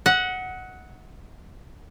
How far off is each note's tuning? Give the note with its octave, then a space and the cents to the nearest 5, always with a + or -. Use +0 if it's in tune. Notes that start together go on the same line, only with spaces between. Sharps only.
D#5 +45 F#5 +0